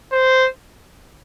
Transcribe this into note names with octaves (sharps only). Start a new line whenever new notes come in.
C5